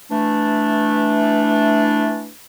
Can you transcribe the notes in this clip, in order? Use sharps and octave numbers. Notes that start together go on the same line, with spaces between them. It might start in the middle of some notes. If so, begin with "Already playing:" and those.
E3 A3 D4